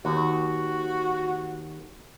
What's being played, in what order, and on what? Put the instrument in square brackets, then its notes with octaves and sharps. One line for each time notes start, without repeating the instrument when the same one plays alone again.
[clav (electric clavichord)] D#2 [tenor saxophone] F#4